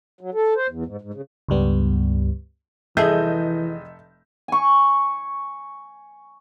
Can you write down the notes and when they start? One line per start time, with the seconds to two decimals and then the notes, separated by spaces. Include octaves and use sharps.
0.21 F#3
0.34 A4
0.56 C5
0.69 E2
0.86 G#2
1.02 G#2
1.14 C#3
1.49 C#2 G2 G3 B3
2.97 F1 E3 G#4 A4 D#5 E5 G6
4.48 G#5 C#6